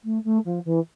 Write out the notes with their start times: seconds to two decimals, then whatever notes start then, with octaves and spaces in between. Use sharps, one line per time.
0.04 A3
0.24 A3
0.45 F3
0.65 E3